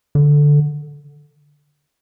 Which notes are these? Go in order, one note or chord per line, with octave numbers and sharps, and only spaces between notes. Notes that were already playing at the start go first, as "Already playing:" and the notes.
D3